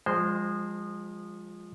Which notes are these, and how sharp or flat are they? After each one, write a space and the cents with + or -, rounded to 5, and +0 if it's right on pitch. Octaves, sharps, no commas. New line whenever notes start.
F3 +10 G#3 -25 C5 -10